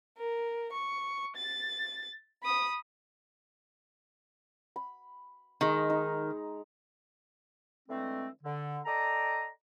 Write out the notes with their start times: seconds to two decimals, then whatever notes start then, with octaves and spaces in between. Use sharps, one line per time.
0.18 A#4
0.73 C#6
1.36 A6
2.43 B5 D#6
4.76 B5
5.61 D#3 G#3 A#5
5.90 D#4
7.89 D3 E3 G#3 A3 C4
8.43 D3
8.86 A4 D5 D#5 G5 A#5